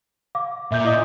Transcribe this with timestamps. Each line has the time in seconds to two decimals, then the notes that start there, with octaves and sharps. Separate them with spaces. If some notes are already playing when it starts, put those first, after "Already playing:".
0.35 F5 D6
0.72 A#2 E5 G6
0.85 E4 D#5 D#6